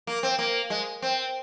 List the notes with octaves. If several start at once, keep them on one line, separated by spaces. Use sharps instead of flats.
A#3
C4
A#3
G#3
C4